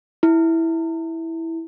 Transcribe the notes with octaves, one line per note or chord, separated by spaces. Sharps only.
E4